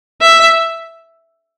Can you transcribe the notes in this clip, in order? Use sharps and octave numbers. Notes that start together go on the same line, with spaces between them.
E5